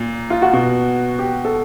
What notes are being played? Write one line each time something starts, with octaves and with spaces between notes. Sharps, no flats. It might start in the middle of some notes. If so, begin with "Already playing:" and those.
Already playing: A#2
F4
F#4
B2
G4
A4